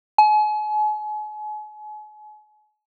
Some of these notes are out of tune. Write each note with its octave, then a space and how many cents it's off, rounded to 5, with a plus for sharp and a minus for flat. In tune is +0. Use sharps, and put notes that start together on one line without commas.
G#5 +40